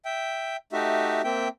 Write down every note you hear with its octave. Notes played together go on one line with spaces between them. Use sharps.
E5 G5
A3 D#4 F#4 G4 E5
A#3 C4 E5 G5